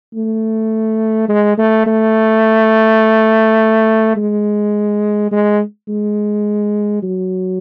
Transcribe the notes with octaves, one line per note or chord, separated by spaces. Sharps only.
A3
G#3
A3
A3
G#3
G#3
G#3
F#3